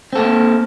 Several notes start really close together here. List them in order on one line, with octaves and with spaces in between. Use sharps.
C4 A4 A#3